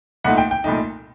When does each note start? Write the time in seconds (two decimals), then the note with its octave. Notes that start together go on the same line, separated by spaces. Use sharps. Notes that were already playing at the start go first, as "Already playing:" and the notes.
0.24 C2 A#2 A3 D#4 F#5
0.38 G5
0.51 G5
0.64 C2 A#2 A3 D#4